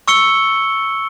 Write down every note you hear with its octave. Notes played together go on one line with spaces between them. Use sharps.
C#6 E6 C#7 G7